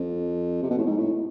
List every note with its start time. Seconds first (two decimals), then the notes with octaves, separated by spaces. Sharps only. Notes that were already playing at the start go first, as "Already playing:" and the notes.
Already playing: F2
0.63 C3
0.70 B2
0.78 A2
0.86 G#2
0.98 A2